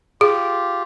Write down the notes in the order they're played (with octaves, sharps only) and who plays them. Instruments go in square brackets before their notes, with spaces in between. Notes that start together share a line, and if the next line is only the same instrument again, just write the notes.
[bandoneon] F4 G4 [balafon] G#4